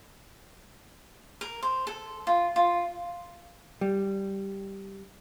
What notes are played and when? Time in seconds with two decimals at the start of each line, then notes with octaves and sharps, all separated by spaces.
1.41 A#4
1.63 C5
1.87 A4
2.27 F4
2.56 F4
3.81 G3